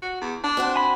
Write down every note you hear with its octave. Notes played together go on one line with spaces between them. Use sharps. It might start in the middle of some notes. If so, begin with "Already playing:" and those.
F#4
E2
D4
C4 F#4 C5
G#5 B5